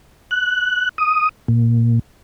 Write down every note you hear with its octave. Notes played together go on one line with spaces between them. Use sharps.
F#6
D#6
A#2